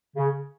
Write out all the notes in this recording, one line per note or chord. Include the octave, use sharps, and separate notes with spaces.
C#3